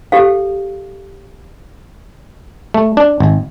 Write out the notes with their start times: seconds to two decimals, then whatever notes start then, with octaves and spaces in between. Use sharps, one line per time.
0.12 G4 A4 F5
2.74 A3
2.97 D4
3.20 G#1